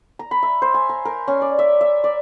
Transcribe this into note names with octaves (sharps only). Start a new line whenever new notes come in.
A#5
B5
E5
C5
G#5
A#5
A#4
C#4
D5
E5
E5
D5